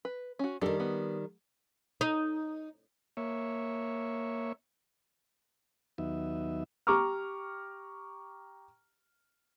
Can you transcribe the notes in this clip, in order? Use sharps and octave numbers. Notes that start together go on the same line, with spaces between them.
B4
C#4 F#4
D#3 G3 D4 A4 A#4
B3
D#4
A#3 C#5 E5
D#2 F#3 B3 D#4 E5
G4 A#5 C#6 D6 F6